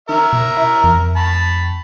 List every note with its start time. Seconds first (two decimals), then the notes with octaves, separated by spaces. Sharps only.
0.09 D#3 A#4 E5 A#5
0.33 B2
0.57 E4
0.84 F2
1.16 A5 B5